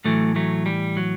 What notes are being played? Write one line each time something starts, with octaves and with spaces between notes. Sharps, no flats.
A2 E3 F#3 A3
F#3 A3
G3
F#3